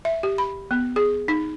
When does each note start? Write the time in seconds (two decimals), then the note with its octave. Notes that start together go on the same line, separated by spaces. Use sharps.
0.05 E5
0.23 G4
0.38 B5
0.71 B3
0.96 G#4
1.28 D#4